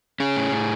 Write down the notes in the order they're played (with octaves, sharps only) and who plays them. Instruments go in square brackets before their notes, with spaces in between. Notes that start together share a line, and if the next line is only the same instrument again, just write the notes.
[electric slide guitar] C#4 G#4
A2
A2